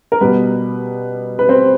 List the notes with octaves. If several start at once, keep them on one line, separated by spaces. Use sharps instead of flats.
A#4
B2 G3 B3 B4
B4
C4 C5